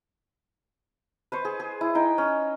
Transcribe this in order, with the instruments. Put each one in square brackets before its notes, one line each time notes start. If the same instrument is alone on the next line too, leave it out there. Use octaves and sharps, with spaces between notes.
[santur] B4 C5 C#6
G#4
G#4
E4
D#4 G5
C#4